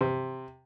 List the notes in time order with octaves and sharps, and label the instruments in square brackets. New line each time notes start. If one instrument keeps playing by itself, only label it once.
[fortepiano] C3